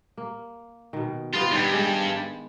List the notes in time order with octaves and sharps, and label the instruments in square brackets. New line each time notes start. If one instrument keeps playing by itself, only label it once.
[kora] A#3
B2 D#3
[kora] C3 B3 G5 [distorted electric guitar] F4
[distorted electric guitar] G2 [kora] D#3 B3
[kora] G#3